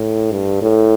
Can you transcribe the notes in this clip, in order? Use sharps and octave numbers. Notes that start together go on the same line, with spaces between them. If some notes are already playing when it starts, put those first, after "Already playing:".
Already playing: A2
G2
A2